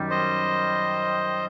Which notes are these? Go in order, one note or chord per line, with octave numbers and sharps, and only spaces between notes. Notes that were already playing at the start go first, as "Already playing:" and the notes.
Already playing: F#2 D#3 G3
C5 D#5